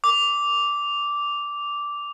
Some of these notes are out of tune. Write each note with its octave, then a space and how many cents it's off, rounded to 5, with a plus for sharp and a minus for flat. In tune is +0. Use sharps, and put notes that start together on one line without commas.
D6 -10